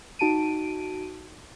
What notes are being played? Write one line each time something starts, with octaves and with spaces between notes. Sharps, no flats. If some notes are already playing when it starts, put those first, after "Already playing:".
D#4 F#4 A5 D7 D#7